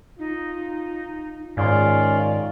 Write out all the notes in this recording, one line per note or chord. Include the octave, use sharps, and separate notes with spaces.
D#4 F4
G#2 D#3 C#4 F4 D5 F5